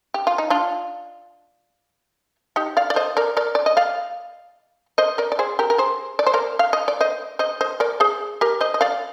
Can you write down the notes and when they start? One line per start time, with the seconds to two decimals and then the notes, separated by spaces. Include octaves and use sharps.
0.14 G4
0.27 F4
0.38 D#4
0.50 D4 F4
2.56 D#4 G4
2.77 D5 F5
2.90 D5
2.96 C5 D#5
3.17 A#4 D5
3.37 A#4 D5
3.55 D5
3.66 D#5
3.77 D5 F5
4.98 C5 D#5
5.18 A#4 D5
5.32 D5
5.39 G#4 C5
5.59 G4 A#4
5.70 A#4
5.78 G#4 C5
6.19 D5
6.27 C5
6.34 A#4 D5
6.59 F5
6.73 D#5
6.88 D5
7.01 C5 D#5
7.39 C5 D#5
7.61 C5 D#5
7.80 A#4 D5
8.00 G#4 C5
8.41 G4 A#4
8.61 C5 D#5
8.74 D#5
8.81 D5 F5